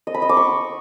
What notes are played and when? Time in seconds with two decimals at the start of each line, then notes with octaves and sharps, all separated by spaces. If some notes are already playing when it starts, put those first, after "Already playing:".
0.07 D#5
0.14 B5
0.22 D#5
0.29 D6
0.37 C#6